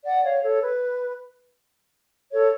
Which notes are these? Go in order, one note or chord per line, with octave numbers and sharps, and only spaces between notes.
D5 F#5
C#5 F5
A4 C#5
B4
A4 C#5